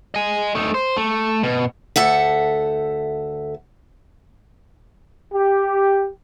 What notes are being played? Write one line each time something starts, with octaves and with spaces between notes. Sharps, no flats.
D#5 G#5
A3 D#4
C5
A3
B2
D2 A4 E5 F#5
G4